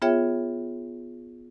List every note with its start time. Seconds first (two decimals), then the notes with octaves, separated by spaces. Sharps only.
0.02 B3 F4 G#4 C#5 E5 G5